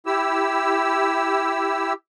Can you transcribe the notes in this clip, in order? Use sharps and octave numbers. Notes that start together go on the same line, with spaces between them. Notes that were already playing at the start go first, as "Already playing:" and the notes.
E4 G4 E6